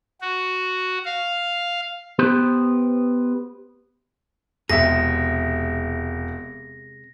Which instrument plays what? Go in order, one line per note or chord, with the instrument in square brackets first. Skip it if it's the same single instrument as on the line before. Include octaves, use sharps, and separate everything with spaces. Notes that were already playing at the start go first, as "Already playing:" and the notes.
[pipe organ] F#4
F5
[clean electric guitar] B3 G4 B4 C5
[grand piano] E1 E5 [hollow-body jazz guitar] C3 G#3 G#4 [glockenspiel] A#6